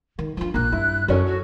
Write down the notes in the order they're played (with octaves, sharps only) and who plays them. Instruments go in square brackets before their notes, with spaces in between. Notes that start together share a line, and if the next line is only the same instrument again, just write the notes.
[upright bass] D#3
[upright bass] F3 D4 [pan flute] F4
[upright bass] A#1 A#2 [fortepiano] A#3 [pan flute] F#6
[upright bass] G2 [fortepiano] E4
[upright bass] F#2 E4 [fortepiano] F#3 C#4 A4 [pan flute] A#4
[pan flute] F#4